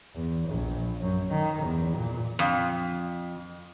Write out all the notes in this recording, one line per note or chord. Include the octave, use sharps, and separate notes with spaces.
E2
A#1
F#2
D#3
E2
A#2
F2